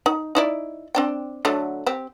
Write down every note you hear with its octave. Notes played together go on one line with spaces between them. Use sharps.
D#4
D#4 E4 D5
C4 D4 G5
D3 F#3 A3
C4 G4